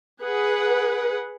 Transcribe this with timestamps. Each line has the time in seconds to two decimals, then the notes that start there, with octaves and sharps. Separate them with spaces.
0.22 G#4 B4 F#5